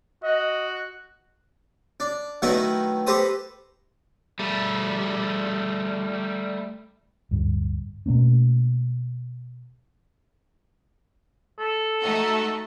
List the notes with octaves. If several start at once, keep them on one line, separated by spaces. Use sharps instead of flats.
F#4 D#5
D4
D#3 F#3 A3 B3 D#4 E4
G4 A4 B4 C5 D#5 D#6
G3 A3
D1 G2
B2 A3 A#3 C#4
A4
A3 D#4 F#4